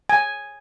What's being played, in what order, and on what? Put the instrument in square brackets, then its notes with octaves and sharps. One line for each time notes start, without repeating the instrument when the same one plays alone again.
[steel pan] G#5